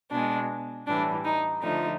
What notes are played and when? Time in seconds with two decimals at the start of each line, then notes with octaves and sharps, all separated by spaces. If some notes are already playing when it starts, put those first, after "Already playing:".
0.11 B2 D4
0.16 G#3
0.87 A2 E3 G3 D4
1.25 D#4
1.62 D3 F3 A3 D#4